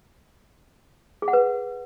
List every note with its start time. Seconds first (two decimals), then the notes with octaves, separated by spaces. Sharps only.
1.22 G#4
1.28 F#5
1.33 B4